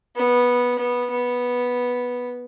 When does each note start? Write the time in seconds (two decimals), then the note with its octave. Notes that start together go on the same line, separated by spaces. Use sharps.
0.16 B3
0.79 B3
1.11 B3